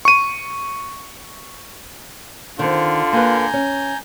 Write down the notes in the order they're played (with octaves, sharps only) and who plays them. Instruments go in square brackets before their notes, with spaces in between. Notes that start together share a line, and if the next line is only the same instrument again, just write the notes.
[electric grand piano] C#6 D#7
[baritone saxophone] D3 [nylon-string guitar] D#3 C4 [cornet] F4
[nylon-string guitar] A#3 B4 [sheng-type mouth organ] G#5 A#5 G6
[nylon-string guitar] C#4